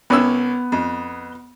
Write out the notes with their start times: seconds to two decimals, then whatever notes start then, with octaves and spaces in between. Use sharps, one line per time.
0.10 C2 B3 C#4 E6
0.72 F2